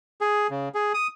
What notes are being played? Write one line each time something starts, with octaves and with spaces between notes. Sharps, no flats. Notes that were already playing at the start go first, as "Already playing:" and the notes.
G#4
C#3
G#4
D#6